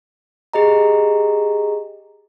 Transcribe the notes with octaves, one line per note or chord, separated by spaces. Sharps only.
G4 G#4 D#5 A#5